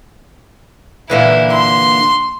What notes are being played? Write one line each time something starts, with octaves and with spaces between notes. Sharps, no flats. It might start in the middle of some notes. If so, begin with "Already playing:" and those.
A#2 D3 E3 E4
C6